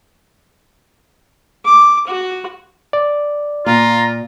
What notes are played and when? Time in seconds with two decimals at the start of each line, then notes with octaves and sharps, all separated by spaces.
1.65 D6
2.07 F#4
2.93 D5
3.66 A#2 F4 A#5